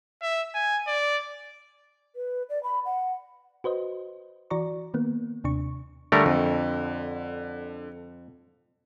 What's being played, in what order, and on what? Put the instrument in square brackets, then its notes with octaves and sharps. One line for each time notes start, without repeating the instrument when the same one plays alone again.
[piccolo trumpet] E5
G#5
D5
[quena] B4
D5
B5
F#5
[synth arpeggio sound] F#4 B4 C5 D#5
E3 F#4 D5 A#5 C#6
D#3 A#3 B3
D#2 C3 D4 C#6
[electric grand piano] D3 [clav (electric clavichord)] G3 A3 A#4
[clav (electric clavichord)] F2